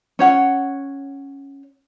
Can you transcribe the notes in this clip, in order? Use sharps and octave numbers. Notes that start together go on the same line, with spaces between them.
C#4 C#5 F#5